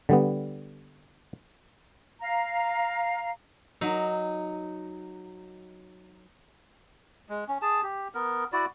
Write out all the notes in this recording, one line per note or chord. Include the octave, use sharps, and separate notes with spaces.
D3 G3 B3
F5 A#5
F#3 D#4
G#3
C#4
G#4 A5
G4
B3 A#4
E4 F#4 D5